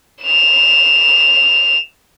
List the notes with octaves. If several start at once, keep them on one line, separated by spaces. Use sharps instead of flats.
E7 F7